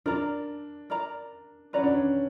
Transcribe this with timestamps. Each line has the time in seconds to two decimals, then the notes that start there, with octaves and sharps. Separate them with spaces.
0.06 D4 A#4 D5 A#5
0.90 A#4 D5 A#5
1.73 C#4 B4 D5 F#5 A#5
1.83 D4
1.94 C#4